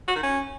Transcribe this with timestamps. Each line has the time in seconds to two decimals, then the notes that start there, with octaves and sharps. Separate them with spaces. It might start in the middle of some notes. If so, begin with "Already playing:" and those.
0.08 F#4
0.16 D#3
0.23 C#4